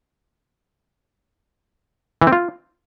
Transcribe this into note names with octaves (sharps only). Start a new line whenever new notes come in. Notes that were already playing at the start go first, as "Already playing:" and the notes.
E3
C4
F4